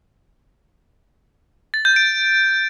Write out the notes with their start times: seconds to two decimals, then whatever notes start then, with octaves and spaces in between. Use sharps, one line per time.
1.74 A6
1.85 G6
1.96 D7